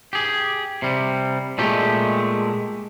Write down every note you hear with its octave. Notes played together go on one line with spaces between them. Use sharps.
G4 G#4
C3 G3
A#2 G#3 A3 G4